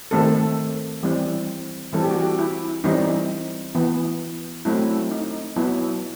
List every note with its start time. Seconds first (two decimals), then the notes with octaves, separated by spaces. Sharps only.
0.11 D#3 A3 C4 A4
1.03 E3 G3 C4
1.93 E3 G3 C4 A4
2.02 G4
2.11 F#4
2.20 G4
2.39 E4
2.84 E3 G3 C4 D#4
3.75 E3 B3
4.65 F#3 A3 C4 E4
5.11 D#4
5.56 F#3 B3 E4